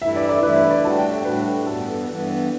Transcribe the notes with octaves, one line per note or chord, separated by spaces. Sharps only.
G2 E3 A3 E4 E5
D5
D5
G2 E3 A3 E4 B4
B4
D5
A2 G3 D4 F#4 A5
G5
E5
A2 G3 D4 F#4 B4
G2 E3 B3 A4
G2 E3 B3